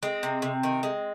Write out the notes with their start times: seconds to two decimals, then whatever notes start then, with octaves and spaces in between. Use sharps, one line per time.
0.03 G#3 C4
0.23 C3
0.42 C3
0.63 D#3
0.83 G#3